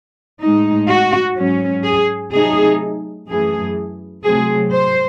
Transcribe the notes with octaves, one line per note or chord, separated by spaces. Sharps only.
A2 G#3 D#4
F#4
G#2 F#3 C#4
G#4
C3 F#3 A3 D#4 G#4
F#2 E3 A3 G#4
C3 F#3 A3 C4 G#4
C5